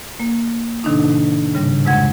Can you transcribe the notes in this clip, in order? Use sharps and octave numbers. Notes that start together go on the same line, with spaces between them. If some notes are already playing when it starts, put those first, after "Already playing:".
A#3
A2 C3 D#3 D4 D#4
G#2 C#3 G3
F2 C3 G#3 F#5 G#6